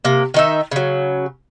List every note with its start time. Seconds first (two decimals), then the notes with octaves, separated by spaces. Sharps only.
0.05 C3 A#3
0.34 D#3 D#4 E5
0.71 C#3 F#3